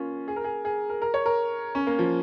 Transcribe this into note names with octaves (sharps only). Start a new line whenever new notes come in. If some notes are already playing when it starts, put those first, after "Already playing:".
Already playing: A#3 C#4 F4
G#4
A#4
G#4
G#4
A#4
A#4
C#5
A#4
C#4
A#3
F3